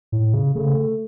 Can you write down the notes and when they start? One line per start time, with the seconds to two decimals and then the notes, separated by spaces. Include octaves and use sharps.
0.12 A2
0.34 C#3
0.55 C#3 A3